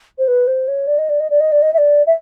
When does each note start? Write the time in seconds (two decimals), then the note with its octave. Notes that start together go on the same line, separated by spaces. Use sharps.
0.19 C5
0.28 B4
0.47 C5
0.68 C#5
0.87 D5
0.98 D#5
1.09 D5
1.20 D#5
1.30 D5
1.40 D#5
1.52 D5
1.62 D#5
1.74 E5
1.78 D5
2.07 E5